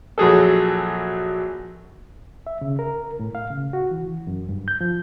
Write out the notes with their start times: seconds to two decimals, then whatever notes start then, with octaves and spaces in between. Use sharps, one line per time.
0.18 A#1 F#3 G#4 A4
2.47 E5
2.61 C#3
2.79 A#4
3.19 A2
3.35 F5
3.50 C#3
3.73 F#4
3.91 E3
4.27 F#2
4.49 G2
4.68 G6
4.81 F3